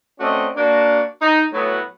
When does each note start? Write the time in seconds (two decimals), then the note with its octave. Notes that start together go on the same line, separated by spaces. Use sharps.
0.20 A3 C4 C#4 F#4 D5 D#5
0.56 A#3 D4 F#4
1.22 D#4
1.53 A2 F#3 B3